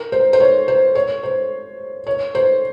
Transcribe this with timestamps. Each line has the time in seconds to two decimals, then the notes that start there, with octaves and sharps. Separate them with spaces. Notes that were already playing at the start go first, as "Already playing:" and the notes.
Already playing: A#4
0.12 C5
0.33 C5
0.40 C#5
0.68 C5
0.95 C#5
1.23 C5
2.07 C#5
2.35 C5